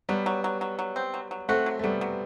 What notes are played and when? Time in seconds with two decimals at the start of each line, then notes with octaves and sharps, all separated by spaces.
0.09 F#3 G3 B3
0.26 F#3
0.44 F#3
0.61 F#3
0.79 F#3
0.96 C4
1.14 F#3
1.31 F#3
1.49 A3 C4 F#4
1.66 F#3
1.79 A3
1.83 F#3 G3 B3
2.01 F#3